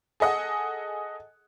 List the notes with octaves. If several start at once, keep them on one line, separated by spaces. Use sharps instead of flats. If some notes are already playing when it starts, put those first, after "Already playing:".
G#4 A4 D#5 F#5